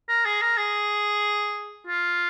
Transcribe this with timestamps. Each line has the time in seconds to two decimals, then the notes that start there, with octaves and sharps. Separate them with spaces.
0.09 A#4
0.25 G#4
0.42 A#4
0.57 G#4
1.87 F4